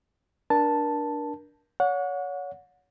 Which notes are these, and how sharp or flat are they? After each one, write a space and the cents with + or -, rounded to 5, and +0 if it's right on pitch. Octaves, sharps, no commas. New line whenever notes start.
D4 +0 A#4 +30 A5 +0
C#5 +30 F#5 -30